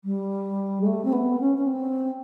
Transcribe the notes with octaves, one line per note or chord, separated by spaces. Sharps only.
G3
G#3
A3
C4
B3
C#4
C#4
C4